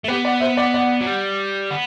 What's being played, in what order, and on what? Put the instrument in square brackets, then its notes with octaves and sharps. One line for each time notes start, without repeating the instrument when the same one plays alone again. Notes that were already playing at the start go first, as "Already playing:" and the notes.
[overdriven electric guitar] A3
[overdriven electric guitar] B3 [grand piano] G4 B4
[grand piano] D5 F#5
C5 E5
D5 F#5
D5 F#5
[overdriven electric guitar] F#3
G3
B3